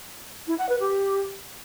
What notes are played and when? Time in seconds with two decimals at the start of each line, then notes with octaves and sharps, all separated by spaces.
0.47 E4
0.58 F#5
0.69 B4
0.79 G4